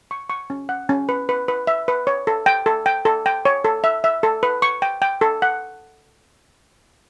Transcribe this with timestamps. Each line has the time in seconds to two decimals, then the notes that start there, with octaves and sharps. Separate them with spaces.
0.11 C#6
0.30 C#6
0.50 C#4
0.69 F#5
0.89 C#4
1.09 B4
1.29 B4
1.48 B4
1.67 E5
1.88 B4
2.07 C#5
2.27 A4
2.46 G5
2.66 A4
2.86 G5
3.05 A4
3.26 G5
3.45 C#5
3.64 A4
3.84 E5
4.04 E5
4.23 A4
4.43 B4
4.62 C#6
4.82 G5
5.02 G5
5.21 A4
5.42 F#5